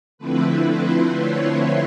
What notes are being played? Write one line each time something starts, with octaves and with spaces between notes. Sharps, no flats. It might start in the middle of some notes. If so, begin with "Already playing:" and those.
D3 F3 A3 C4 E4 B4
C5
C#5